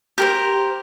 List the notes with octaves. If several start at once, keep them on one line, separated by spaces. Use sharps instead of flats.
G4 A#4 C5